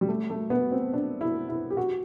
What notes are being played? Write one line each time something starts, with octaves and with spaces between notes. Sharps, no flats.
G3
A3
A3
B3
C4
D4
E4
E4
G4
F#4